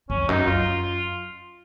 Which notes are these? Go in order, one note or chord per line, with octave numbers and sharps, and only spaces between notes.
F2 C#4
F#2 D#4
F#2 F4